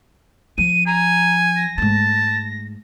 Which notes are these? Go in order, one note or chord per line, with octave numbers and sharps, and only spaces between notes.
F3 D#7
G#5 A#5
A#6
G#2 A3 A5